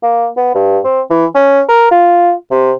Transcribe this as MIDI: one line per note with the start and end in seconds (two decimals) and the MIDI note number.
0.03 0.28 58
0.37 0.53 59
0.55 0.79 43
0.84 1.01 60
1.10 1.25 52
1.35 1.62 61
1.69 1.87 70
1.91 2.33 65
2.51 2.73 48